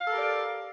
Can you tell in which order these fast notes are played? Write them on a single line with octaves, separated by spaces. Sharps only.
F5 A4 A#4 G4 D5